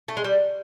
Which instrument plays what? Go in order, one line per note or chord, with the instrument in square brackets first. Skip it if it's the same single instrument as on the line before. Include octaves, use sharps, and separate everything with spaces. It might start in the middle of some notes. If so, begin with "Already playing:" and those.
[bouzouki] A3
G#3
G3